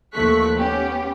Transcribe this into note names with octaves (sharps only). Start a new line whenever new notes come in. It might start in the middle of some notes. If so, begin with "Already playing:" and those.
D#2 F3 A3 C#6 F#6 B6
B3 C#4 G4